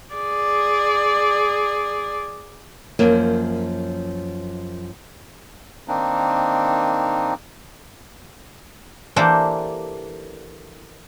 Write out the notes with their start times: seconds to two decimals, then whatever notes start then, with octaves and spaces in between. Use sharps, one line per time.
0.14 G#4 D5
2.99 F#2 F3 A#3
5.88 D#3 A#3 C4 D4 D#4
9.16 E3 A#3 D4 G4 A4 C5